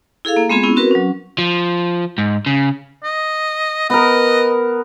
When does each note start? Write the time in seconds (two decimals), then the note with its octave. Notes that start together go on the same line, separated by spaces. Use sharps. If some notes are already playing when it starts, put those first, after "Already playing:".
0.25 E4 G#4 A4 F5
0.36 A#3
0.49 G#3 B3 C4 F4 G#4
0.63 B3 C#4 E4
0.76 C4 F#4 A#4 B4
0.91 F#3 C#4
1.38 F3
2.18 G#2
2.46 C#3
3.04 D#5
3.90 B3 A#4 D#5